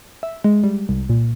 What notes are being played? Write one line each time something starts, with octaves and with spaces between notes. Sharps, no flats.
E5
G#3
G3
C2
A#2